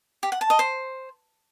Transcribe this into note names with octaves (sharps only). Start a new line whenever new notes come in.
G4
F#5
A5
D#5
C5